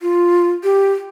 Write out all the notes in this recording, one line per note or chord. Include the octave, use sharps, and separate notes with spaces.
F4
G4